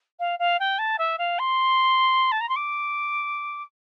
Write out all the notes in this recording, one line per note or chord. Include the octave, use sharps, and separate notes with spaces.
F5
F5
G5
A5
E5
F5
C6
A5
A#5
C6
D6